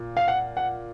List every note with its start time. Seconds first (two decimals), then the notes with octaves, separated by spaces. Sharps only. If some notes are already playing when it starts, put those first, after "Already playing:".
Already playing: A#2
0.17 F5
0.28 F#5
0.57 F#5